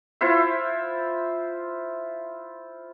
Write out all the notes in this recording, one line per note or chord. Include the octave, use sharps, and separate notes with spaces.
E4 F4 C5 E5